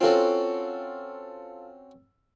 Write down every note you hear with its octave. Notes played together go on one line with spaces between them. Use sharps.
C4 C#4 F4 F#4 A4